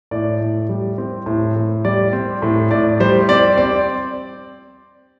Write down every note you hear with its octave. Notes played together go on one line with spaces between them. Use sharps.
A2 D5
A2
G3
C4
A2
A2
G3 D5
C4
A2
A2 D5
G3 C5
C4 D5
C4 D5